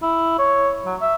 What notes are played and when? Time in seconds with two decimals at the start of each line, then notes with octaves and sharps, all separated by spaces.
0.02 E4
0.39 C#5
0.85 F#3
1.01 E5